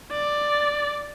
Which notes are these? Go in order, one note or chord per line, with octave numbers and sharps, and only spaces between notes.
D5